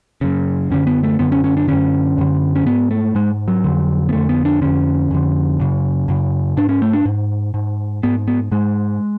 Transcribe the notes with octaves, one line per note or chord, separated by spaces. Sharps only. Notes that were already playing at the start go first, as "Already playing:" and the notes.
F#2 C#3
F#2 D3 C#4
B3
A3
F#2 D3 B3
C#4
C#4
D4
F#2 D3 C#4
F#2 D3
C#4
G#2 B3
A3
G#2 G#3
F#3
F2 D3
B3
F2 D3 A3
B3
D4
F2 D3 C#4
F2 D3
F#2 C#3
F#2 C#3
G#2 D4
C#4
A3
D4
G#2
G#2
G#2 B3
B3
G#2 G#3